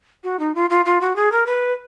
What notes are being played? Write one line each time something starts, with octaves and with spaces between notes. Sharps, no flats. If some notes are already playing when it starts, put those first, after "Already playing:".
F#4
D#4
F4
F4
F4
F#4
G#4
A#4
B4